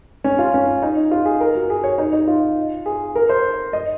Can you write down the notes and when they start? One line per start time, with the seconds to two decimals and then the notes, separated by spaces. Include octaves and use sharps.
0.24 C#4
0.39 F4
0.54 C#4
0.82 D#4
1.11 F4
1.25 G#4
1.41 A#4
1.55 F#4
1.70 G#4
1.84 C#5
1.98 D#4
2.13 D#4
2.27 F4
2.86 G#4
3.15 A#4
3.29 C5
3.73 D#5